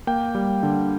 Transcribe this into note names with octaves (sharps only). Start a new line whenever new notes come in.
A#3 G5
G3
D3